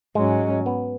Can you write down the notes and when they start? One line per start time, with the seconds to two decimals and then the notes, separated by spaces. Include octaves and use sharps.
0.15 G#2 F#3 G#3 C#4
0.66 B3